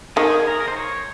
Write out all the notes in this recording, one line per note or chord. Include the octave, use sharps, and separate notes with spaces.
D#3 G#4
G#4
A#4
A#4
C5
C#5